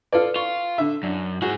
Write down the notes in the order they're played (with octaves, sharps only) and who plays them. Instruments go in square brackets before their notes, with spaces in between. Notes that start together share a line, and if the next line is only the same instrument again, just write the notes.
[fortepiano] F4 A4 D5 [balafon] B4
[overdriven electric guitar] F4 [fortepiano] C#6
[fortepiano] D3 E5
[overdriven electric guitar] F#2 [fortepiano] D4
[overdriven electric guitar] G#2 G#4 [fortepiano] F#4